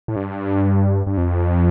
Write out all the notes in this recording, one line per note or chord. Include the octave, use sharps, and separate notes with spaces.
A2
G2
G2
F2